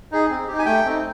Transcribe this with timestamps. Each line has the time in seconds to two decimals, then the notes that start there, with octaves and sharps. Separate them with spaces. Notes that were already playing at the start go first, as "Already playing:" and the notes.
0.12 D#4 G#4
0.30 C4
0.47 G4
0.53 D#4
0.59 G#5
0.66 A3 G5
0.85 C4 D#4